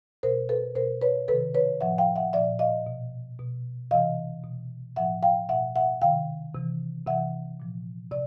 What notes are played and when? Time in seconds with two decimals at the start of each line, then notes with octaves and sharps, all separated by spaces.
0.23 B2 A#4 C5
0.49 A4 B4
0.75 B2 A#4 C5
1.02 B4 C#5
1.28 C3 D#3 A4 B4
1.54 B4 C#5
1.81 A2 F3 E5 F#5
1.98 F5 G5
2.16 E5 F#5
2.33 A#2 F3 D5 E5
2.59 D#5 F5
2.87 B2
3.39 B2
3.91 C3 E3 D#5 F5
4.44 B2
4.96 A2 F3 E5 F#5
5.23 F5 G5
5.49 B2 E5 F#5
5.76 E5 F#5
6.02 C3 D#3 F5 G5
6.54 C3 E3
7.07 C3 E3 E5 F#5
7.60 A#2 F3
8.12 C3 D5